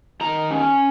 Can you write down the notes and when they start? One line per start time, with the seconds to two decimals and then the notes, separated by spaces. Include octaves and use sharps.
0.21 D#3 A#5
0.51 C#4